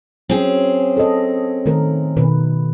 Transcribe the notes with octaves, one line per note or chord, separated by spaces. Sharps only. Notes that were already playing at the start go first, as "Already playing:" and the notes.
F#3 C4 C#4 G#4
A4 D#5
D#3 A3 A#4
B2 D#3 B4